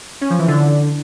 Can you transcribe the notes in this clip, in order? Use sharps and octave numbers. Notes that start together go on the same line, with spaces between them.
C#4
F3
E3
D3